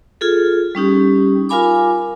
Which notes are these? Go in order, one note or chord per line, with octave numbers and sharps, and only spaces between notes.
F4 G#4 A4
G3 C#4 D#4 G4
F4 A#4 F5 G#5 B5 D6